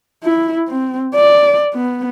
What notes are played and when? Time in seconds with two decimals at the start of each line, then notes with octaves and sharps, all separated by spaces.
0.24 E4
0.68 C4
1.15 D5
1.74 B3